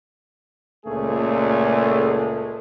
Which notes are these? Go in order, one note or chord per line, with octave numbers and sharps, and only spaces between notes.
C#2 A#2 A3 G#4